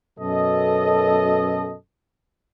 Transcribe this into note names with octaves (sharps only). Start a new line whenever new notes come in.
F#2 B2 A4 D#5